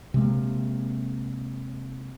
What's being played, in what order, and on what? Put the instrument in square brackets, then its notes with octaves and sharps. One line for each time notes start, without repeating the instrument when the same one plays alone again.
[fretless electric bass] C3 G#3 A#3